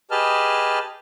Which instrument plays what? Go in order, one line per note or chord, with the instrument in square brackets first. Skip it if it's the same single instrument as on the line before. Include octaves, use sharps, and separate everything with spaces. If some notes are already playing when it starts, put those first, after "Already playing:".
[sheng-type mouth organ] G4 G#4 B4 D#5 A5 F6